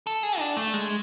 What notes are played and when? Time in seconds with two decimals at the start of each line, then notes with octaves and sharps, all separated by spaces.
0.07 A4
0.23 G#4
0.39 D4
0.57 A3
0.73 G#3